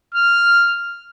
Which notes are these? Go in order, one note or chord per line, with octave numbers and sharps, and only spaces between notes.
F6